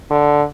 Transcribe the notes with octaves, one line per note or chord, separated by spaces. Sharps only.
D3